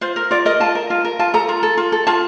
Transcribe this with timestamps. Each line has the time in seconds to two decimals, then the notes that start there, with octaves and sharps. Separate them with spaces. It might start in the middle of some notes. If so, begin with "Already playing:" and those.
0.01 F4 C5
0.16 A#4
0.31 F4 D5
0.45 A#4 D#5
0.60 F4 A5
0.75 A#4
0.90 F4
1.04 A#4
1.19 F4 A5
1.34 A4 A#5
1.49 F4
1.63 A4
1.77 F4
1.92 A4
2.07 F4 A5